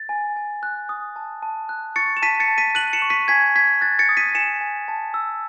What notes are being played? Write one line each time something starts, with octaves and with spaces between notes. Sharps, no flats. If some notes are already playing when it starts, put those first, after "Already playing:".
Already playing: A6
G#5
G#5
F#6
D#6
A5
A5
F#6
C#6 A6 C#7
E7
A5 B6 D#7
A6 C#7
A5
B6 D#7
F#6 D#7 F#7
C#7 E7
C#6
B6 D#7
G#5 G#6 B6
G#5 G#6 B6
F#6 A6
A6 C#7
D#6
B6 D#7
G#5 C#7 E7
G#5
A5
E6